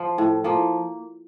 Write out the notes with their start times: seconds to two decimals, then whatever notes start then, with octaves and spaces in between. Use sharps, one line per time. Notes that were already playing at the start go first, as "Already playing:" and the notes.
Already playing: F3 F4
0.18 A2
0.44 F3 A#3